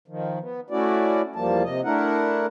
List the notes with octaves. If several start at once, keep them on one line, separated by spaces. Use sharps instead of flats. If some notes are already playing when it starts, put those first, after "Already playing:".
D#3 F3
B3
A3 C#4 E4 F#4 D5
E2 F3 G3 A#3 A5
C3 D#5
A3 D4 E4 A#4 F#5